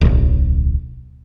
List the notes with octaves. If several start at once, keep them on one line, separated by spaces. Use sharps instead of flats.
D1 B1